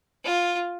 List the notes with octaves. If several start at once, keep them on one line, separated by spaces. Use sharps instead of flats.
F4